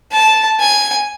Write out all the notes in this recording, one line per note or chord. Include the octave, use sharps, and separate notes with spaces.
A5
G#5